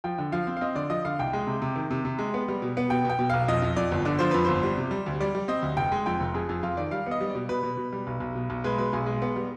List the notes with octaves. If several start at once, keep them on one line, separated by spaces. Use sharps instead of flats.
F3 G5
D3
F3 F5
C4
F5
C4 D#5
D3 D5
F3 D#5
D3 F5
C2 G5
G#3
C3
C3
D#3
C3
C3
G#3
B3
G3
B2
B3
B2 G5
B2 G5
B2
B1 F5
F2 D#5
F2
F2 D5
G1
D3 D5
F3 C5
F2 B4
G1 C5
G3
C3
G3
D2
G3 D5
G3
C4 D#5
D2
F1 G5
G#3
F2 G5
F1
F2 G#4
F2 G#4
F2 F4
D#3 D5
G3 F5
B3 D#5
G3
D5
B2
B2 B4
B2
B2
G3
B1
B1
B2
B1
G#3 B4
B2 B4
B1 G#4
G#3
B3
G3